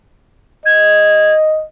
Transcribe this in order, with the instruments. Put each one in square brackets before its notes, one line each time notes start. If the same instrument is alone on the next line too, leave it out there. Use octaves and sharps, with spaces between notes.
[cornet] D#5 [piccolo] G#6